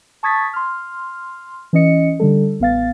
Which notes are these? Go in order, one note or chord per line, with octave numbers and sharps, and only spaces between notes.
A5 C#6 D#6 G#6 A6 B6
C6 F6
E3 C#4 D#5 C#7
D3 G3 A4
A1 B3 F5 A6